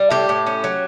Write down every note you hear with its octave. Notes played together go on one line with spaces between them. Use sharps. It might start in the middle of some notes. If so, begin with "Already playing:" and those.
Already playing: G3
A2 G4
A2
C#4
F#3